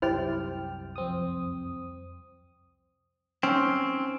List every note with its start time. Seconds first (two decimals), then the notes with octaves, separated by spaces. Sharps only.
0.02 C2 F#2 E4 G4 C5 G5 F6 A6
0.96 F2 C4 D#6
3.43 C4 C#4